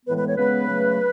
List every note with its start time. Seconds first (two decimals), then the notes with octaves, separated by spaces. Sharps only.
0.06 A2 E3 G#3 B3 B4
0.16 B4
0.26 C#5
0.37 C#3 G#3 B3 B4
0.67 C#3 F#3 A3